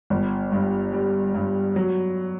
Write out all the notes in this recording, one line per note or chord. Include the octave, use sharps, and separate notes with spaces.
G1
G2
G3
G2
F#3